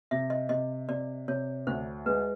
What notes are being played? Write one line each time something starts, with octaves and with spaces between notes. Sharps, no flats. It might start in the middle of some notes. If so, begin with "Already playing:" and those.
C3 E5
D#5
C3 D#5
C3 D5
C3 C#5
D2 C5
G#3 B4